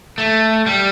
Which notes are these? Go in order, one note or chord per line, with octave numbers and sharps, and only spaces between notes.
A3
G3